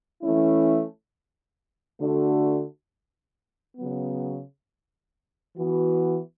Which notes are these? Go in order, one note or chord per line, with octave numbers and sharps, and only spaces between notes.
E3 A3 C#4 E4
D3 A3 D4 F#4
C#3 F#3 B3
E3 B3 F#4